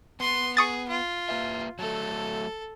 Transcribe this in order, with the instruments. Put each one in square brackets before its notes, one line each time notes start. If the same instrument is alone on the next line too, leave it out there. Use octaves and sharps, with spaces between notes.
[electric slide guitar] B3 [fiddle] C6
[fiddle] G#4 [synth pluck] C#6 D#6 A6
[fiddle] F4
[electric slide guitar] A#3 B4 E5
[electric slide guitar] F#3 A3 [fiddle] A4